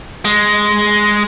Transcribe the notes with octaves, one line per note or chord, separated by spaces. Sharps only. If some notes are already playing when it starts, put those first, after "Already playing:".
G#3